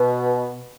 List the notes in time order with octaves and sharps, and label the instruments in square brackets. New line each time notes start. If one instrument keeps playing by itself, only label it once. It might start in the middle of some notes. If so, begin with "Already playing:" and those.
Already playing: [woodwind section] B2